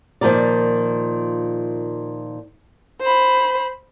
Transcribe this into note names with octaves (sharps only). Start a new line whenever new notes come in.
A#2 D#3 F3 F#3 A#4 D5
C5 B5